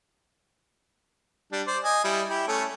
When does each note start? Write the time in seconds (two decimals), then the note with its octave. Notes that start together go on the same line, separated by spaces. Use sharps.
1.52 G3 D4
1.67 C5 D5
1.84 D#5 G#5
2.04 G3 E4
2.30 E4 G4
2.48 A3 C#4 A4